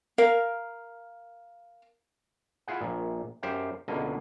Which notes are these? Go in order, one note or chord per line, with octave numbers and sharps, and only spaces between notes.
A#4 F5
E4 F4 G#4 F#5
A#1 A#2
F#2 G4 C5 F5 G5
C#2 B2 D3 A#3 D#5